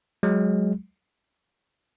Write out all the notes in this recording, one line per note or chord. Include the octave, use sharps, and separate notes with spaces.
F#3 G#3